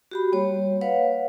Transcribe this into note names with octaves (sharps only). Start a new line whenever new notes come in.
F#4 G4 B5
G3 A#3 C#5
B4 C#5 F5 F#5